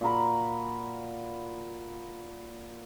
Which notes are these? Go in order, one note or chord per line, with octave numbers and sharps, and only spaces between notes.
A#2 F#4 A#4 B5